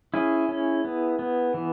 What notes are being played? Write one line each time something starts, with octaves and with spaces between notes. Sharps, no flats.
C#4 E4 G#4
C#4
B3
B3
E3